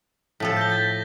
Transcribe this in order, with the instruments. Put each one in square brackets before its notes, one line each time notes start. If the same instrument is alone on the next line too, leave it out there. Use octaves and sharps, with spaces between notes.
[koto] A2 F3 A4 [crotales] B6
[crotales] G6 A#6 G7
G6 A6 B6